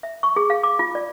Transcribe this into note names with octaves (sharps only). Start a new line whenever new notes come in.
E5
C#6
G#4
F5
D6
F4
D5